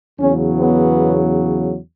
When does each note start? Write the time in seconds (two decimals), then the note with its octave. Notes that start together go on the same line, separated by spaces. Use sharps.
0.19 E2 C#3 F#3 C#4
0.58 B3